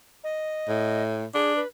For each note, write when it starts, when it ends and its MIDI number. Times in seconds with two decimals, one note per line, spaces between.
0.24 1.03 75
0.69 1.25 45
1.34 1.61 62
1.34 1.55 68
1.56 1.67 71